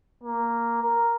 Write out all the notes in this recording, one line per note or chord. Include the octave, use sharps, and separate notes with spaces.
A#3
A#4